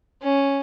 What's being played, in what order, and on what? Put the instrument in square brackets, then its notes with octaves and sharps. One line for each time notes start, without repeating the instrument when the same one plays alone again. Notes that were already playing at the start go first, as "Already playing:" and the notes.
[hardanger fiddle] C#4